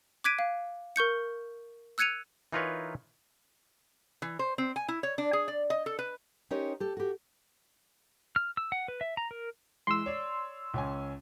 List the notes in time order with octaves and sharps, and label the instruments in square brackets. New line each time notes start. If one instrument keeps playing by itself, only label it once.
[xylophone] D6 F#6 G#6 B6 D7 D#7
F5
A#4 C#6 G6 C#7
E6 F#6 G#6 C#7 D#7 F7
[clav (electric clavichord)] E3 D#4 F4 A#4 B4 C#5
[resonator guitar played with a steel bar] E3
C5
C4
G#5
E4
C#5
D4
G#4
D5
D#5
A4
B4
[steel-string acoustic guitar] C#4 D#4 G4 A#4 C5 C#5
G4 A4
F#4 G4
[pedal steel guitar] F6
E6
F#5
B4
E5
A#5
A#4
[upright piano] E3 G#3 [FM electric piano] C6 E6
[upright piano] C#5 D5
C#2 C#4 G#5